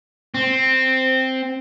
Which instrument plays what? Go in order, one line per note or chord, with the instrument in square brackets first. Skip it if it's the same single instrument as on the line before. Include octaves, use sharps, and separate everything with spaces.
[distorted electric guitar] C4